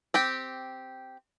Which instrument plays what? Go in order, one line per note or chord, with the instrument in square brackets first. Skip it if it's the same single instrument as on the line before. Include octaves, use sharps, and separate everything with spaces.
[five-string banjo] C4 G4 G5